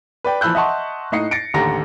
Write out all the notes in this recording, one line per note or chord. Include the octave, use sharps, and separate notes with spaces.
B4 D5 G5
E3 F3 B5 E6 F#6 G6
D#5 E5 F#5 A5 C6 C#6
A2 D#4 D#5 C7 C#7
A6 A#6 C#7 D7
A1 D#2 D3 G4 A#5 A#6